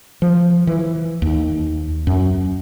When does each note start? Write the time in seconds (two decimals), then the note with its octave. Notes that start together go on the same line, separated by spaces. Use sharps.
0.22 F3
0.67 E3
1.22 D#2
2.07 F#2